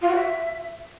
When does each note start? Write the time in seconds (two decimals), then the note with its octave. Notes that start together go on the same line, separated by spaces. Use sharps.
0.01 F4
0.08 F#4
0.15 E5